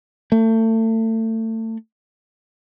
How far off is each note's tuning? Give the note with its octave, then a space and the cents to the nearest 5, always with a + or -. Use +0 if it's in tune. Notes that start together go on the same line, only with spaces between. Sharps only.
A3 +30